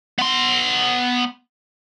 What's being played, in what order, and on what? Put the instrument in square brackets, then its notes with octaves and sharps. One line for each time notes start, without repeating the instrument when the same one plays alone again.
[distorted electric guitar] B3 C6